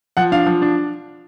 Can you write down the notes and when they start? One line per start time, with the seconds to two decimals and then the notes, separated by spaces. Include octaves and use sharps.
0.17 F3 F#5
0.32 D4 F5
0.47 F3
0.62 D4